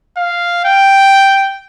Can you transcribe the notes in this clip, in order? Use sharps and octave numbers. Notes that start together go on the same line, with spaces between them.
F5
G5